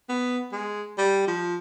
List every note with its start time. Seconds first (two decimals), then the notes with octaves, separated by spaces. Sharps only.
0.09 B3
0.52 G#3
0.98 G3
1.28 F3